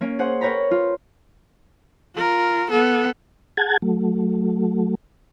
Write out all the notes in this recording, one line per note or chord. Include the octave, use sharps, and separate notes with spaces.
A#3 C#4 D7
G#4 C5 F#5
A#4 B4 C#5 G5 A#5 B5
F4
F4 A#4
B3 A4
G#4 F#5 A5 G#6
F#3 A3